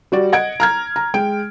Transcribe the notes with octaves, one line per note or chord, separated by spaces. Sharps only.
G3 F#4 D5
D#5 F#5 G#6 D7
A#5 F6 G#6
A#5
G#3 G5 D7